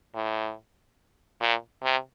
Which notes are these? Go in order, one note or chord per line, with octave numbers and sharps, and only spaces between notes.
A2
A#2
C3